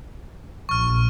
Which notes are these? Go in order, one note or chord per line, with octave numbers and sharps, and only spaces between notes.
A#1 C#6 F6